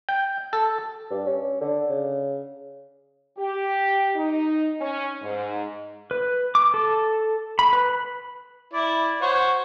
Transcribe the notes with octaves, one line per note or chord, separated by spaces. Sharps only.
G5
A4
G2
C#4
D3
C#3
G4
D#4
C#4
G#2
B4
D6
A4
B5
B4
E4 D5
F#4 C5 C#5